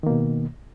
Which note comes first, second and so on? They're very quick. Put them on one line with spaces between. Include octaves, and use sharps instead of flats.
D#3 A#3 B2